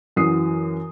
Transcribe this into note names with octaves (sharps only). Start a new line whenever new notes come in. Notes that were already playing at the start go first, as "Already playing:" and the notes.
F#2 E3 F#4 D#6 C7